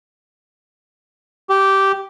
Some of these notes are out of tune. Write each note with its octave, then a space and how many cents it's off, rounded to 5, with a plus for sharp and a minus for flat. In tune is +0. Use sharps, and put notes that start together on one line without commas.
G4 -10